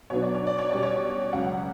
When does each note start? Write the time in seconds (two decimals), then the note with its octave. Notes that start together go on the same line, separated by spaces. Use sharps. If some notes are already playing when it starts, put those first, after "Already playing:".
0.10 B2 F#3 B3 D4 C#5
0.22 D5
0.34 C#5
0.47 D5
0.59 C#5
0.70 B2 G3 C#4 D5
0.83 C#5
1.33 C#2 C#3 F#3 F#5